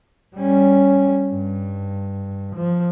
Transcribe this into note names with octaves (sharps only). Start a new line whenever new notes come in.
G3 C#4
G2
F3